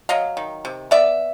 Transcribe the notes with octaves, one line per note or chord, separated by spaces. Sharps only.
F#3 D#5 F5
D#3
C3
B3 D5 E5